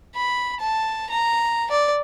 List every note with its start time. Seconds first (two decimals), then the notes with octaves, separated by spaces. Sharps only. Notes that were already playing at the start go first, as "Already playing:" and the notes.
0.16 B5
0.60 A5
1.10 A#5
1.71 D5